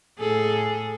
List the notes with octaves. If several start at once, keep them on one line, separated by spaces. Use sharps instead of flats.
A2 G#4 A4